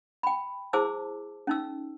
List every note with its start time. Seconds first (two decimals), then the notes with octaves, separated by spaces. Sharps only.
0.23 G5 B5
0.73 E4 G#4 C5 A5 D6 E6
1.47 C#4 D#4 E6